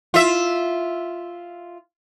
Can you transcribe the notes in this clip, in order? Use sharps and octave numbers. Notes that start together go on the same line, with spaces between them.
F4 E5